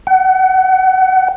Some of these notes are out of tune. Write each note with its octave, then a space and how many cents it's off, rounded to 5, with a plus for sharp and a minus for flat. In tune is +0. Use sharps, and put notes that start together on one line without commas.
F#5 +30